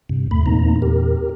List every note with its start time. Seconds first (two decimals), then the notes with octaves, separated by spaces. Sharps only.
0.09 G2 C3
0.31 D#2 A3 B5
0.46 E2 A#2 A#3 C4 D#4 A#5
0.82 G4 A#4